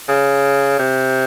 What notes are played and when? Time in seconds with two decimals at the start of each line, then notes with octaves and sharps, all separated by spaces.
0.08 C#3
0.79 C3